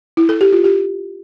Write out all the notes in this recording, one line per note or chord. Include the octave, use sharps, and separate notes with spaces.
E4
A4
G4
F4
G4